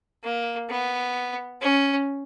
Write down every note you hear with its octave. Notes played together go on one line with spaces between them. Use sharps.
A#3
B3
C#4